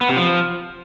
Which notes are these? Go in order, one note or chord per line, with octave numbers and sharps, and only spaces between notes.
B3
C3
F3